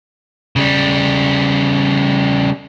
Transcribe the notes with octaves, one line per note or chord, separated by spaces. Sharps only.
C#3 G3